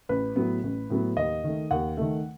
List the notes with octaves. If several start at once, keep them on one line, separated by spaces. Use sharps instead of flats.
A1 B4
A2 F#3 B3
A1
A2 F#3 B3
D#2 D#5
D#3 A3
D#2 F#5
D#3 A3